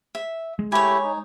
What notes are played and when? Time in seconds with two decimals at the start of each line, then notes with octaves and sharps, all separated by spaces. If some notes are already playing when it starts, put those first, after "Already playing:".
0.15 E5
0.59 G#3
0.72 A3 E4 G4 C#5 G#5
1.04 D#4